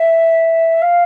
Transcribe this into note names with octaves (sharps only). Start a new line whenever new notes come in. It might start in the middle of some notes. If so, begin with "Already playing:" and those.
Already playing: E5
F5